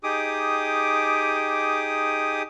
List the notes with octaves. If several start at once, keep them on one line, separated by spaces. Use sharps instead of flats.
D#4 G4 G#4 D6 D#6